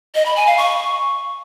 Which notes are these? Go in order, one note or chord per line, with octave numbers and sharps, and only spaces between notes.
D#5
B5
G#5
F5
C#6